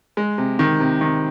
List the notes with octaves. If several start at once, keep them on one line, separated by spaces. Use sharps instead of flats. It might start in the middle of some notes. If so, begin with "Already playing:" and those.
G#3
C3
D#3
C3
D#3